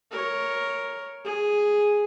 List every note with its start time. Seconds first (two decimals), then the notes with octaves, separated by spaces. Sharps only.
0.12 A#4 C#5
1.25 G#4